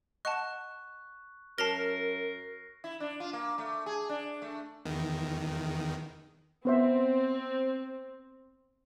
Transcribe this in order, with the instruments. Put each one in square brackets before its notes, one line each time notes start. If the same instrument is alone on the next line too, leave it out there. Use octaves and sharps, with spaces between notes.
[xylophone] D#5 F#5 A5 [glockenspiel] C#6 F#6
[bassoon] F#2 [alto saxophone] A#4 [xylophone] A5 F7 G7 [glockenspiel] A#6 C7
[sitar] E4
D4
F4
A#3
A3
G#4
D4
A3
[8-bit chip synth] E2 D#3
[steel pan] B3 C5 E5 [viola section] C4